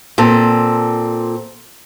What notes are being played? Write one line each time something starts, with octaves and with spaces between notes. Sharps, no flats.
A#2 C4 A4